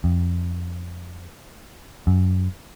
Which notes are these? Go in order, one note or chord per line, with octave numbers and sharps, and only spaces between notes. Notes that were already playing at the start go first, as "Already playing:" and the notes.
F2
F#2